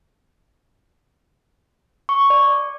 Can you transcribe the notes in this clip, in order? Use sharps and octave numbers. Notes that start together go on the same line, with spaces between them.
C#6
D5